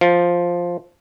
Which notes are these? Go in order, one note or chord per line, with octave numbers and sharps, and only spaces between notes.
F3